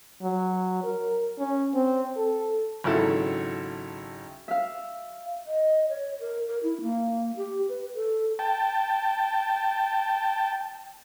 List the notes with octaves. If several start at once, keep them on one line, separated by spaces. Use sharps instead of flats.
F#3
A#4
C#4
C4
A4
G#1 C#3 F#3 E4 A4 F#5
E5 F5
D#5
C#5
A#4
A#4
E4
A#3
G4
B4
A4
G5 A5